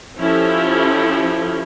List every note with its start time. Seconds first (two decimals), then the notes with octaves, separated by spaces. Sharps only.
0.19 F3 C#4 E4 G4 A4